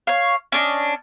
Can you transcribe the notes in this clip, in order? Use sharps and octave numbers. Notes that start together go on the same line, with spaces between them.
C#5 F5
C#4 D4 D#5